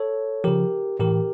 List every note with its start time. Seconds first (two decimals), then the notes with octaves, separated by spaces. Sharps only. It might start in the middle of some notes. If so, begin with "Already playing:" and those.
Already playing: A4 C#5
0.44 C#3 F3 G4 A#4
0.99 A2 E3 G4 A#4